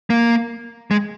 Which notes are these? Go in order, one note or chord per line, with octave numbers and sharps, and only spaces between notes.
A#3
G#3